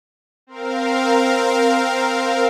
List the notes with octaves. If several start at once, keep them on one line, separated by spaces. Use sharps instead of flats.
C4 A#4 F5